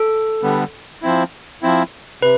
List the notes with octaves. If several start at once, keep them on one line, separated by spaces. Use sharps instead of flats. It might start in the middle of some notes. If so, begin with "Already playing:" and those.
Already playing: A4
D3 G3 B3
F3 C4 E4
F3 C4 E4
C3 B4